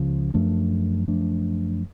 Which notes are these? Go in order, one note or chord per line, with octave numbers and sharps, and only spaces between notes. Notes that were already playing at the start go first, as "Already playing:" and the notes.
Already playing: C#2 C#3 F3
F#2 F3 A3 D4
F#2 F3 A3 D4